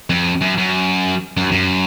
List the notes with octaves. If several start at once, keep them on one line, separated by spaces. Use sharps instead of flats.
F2
F#2
F#2
F#2
F#2